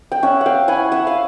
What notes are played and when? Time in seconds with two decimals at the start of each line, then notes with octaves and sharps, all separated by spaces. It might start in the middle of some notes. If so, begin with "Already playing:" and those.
0.12 G5
0.23 C#4 E5 F#5
0.41 F#5
0.46 F5 G5
0.68 E4 F#5 G#5
0.92 E5 F#5
1.07 F5